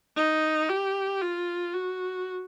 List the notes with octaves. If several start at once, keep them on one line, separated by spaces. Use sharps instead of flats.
D#4
G4
F4
F#4